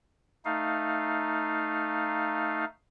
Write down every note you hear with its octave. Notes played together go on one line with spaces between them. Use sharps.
A3 D#4 F5